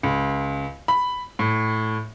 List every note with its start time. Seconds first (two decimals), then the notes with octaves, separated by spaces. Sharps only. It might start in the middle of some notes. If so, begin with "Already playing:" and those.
0.03 C#2
0.88 B5
1.39 A2